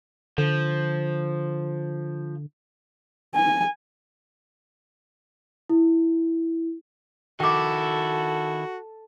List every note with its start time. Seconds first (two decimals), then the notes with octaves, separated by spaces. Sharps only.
0.38 D3 F3
3.35 G#5
5.70 E4
7.40 D#3 E4 F#4 A4 G5 D6